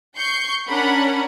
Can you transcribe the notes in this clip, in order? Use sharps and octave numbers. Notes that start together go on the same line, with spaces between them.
C#6 G6 C7 C#7
C#4 D4 A#4 F#5 B5